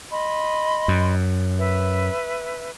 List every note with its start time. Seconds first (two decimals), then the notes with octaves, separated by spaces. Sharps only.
0.11 D#5 B5 C6
0.88 F#2
1.58 B4 E5